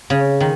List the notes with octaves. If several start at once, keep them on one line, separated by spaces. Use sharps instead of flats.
C#3
D#3